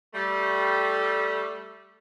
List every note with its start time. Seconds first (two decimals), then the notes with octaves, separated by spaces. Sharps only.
0.14 G3 A3